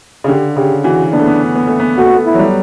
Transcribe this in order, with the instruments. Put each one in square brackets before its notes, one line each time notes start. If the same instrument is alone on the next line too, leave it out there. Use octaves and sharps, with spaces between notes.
[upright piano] C#3
[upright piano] D3 [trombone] G4
[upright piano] C#3 [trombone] G4
[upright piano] E3 [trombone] F#4
[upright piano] B3 [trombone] D4
[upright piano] A3
B3
B3
A3
B3
[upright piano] A3 [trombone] F#4
[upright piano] B3
A3
[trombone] E4
[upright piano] F#3
G3